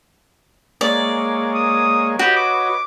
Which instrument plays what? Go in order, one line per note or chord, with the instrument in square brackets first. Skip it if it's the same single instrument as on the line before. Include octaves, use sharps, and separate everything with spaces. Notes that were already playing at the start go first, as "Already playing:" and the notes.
[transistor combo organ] G#3 A#3 C#5 [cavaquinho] D5
[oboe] D#6
[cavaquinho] F#4 [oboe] G4 [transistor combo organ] B4 C#5 D#5
[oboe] D6